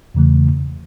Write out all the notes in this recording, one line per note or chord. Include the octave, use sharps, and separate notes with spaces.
E2 C#3 E3 A3